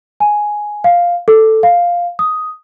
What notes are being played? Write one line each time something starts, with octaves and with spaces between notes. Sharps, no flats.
G#5
F5
A4
F5
D#6